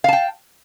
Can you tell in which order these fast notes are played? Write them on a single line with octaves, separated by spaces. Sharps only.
F5 A5 G5